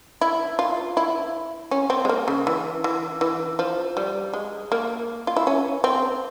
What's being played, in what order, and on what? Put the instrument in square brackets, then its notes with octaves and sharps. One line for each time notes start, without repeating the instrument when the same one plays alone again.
[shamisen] E4
F4
E4
C#4
C4
G#3
A#3
C#3
E3
E3
E3
F3
G3
G#3
A#3
F4
E4
C#4
C4